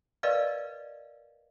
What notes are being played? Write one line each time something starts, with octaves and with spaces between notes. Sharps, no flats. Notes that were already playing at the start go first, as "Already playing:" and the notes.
A#4 B4 D5 D#5 F5